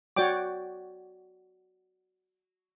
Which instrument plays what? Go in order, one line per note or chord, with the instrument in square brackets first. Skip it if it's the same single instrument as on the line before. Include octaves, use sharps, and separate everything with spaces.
[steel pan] F#4 C#5 D5 G5 D6